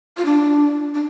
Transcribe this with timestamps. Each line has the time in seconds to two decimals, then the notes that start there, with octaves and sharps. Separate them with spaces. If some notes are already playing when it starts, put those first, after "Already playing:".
0.17 F4
0.25 D4
0.94 D4